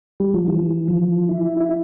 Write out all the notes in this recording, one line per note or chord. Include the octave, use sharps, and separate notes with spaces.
G3
F3
E3
F3
E4
E4